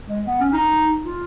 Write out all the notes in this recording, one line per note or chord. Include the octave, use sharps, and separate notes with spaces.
G#3
B3
C#4
D#4
F4